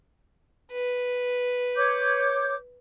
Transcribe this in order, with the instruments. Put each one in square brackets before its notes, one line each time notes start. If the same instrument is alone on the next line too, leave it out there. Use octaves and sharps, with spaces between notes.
[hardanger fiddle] B4
[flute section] C#5 D6 G6